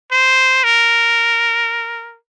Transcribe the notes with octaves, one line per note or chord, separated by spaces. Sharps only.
C5
A#4